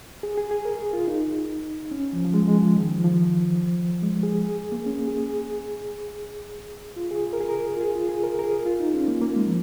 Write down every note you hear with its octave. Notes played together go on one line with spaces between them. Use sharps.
G#4
G#4
G#4
A#4
G#4
F4
D#4
C#4
F3
F3
G#3
G#3
F3
D#3
F3
F3
G#3
G#4
G#4
A#3
C#4
G#4
G#4
F4
G#4
A#4
G#4
A#4
F4
G#4
F4
G#4
A#4
A#4
G#4
F4
D#4
C#4
A#3
A#3
G#3
F3